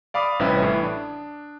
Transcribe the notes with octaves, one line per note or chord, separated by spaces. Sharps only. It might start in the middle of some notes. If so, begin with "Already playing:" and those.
D5 F5 B5 D6 D#6
A1 C3 G3 C#4 E4 B4
A2 E3
D4